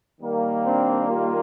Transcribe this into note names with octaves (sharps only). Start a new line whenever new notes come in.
D#3 G3 A#3
C4 D4
F4 G4